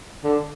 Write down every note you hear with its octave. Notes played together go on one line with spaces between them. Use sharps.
D3